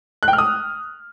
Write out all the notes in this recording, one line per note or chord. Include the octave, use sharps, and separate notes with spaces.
F#6
G5
F6
D#6